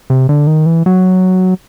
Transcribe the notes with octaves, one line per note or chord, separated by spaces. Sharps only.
C3
D3
D#3
E3
F#3